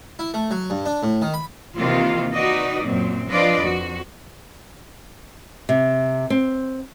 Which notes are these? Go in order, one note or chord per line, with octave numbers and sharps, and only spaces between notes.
E4
A3
F#3
G2
D4
A2
D#3
B5
C3 D#3 E3 A#3 D#4 F4
D#4 F#4 B4 D5 D#5
F#2 A#2 F#3 C4
F3 D4 F4 B4 D5 D#5
F2 F#4
C3
C4